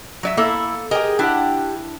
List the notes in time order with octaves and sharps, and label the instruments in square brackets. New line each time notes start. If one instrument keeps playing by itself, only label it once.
[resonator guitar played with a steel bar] F#3 D5 E5
[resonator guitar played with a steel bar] A#3 A4 [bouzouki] E4
[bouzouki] G4 G#4 [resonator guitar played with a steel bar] A#4 D#5
[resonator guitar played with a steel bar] D4 E4 [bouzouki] G4 F#5